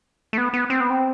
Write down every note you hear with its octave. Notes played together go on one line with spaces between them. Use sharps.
A3
B3
B3
C4
B3
C4